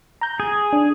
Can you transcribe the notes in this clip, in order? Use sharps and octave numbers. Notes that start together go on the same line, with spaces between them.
A#5 G6
G#4 G#6
D4